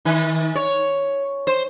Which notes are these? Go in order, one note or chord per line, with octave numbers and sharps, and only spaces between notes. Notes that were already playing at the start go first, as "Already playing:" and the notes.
D#3
C#5
C5